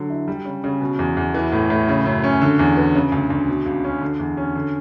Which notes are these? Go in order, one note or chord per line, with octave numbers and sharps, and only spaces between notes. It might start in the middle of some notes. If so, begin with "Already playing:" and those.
Already playing: D3 F#3
E4
G3
C#3
C#3
B2
E2
E2
E3
A2
A2
C#3
F#2
C#4
D3
E2
B3
C#3
D2
D2
B2
C#2
C#4
D3
E2
C#4
D3